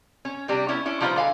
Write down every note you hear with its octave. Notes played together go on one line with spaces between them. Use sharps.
C#4
C3 G3 D4
B3 C#4 E4
C#4 D4 E4
F3 G3 D#4 F4 B4 C5
D3 F5 G#5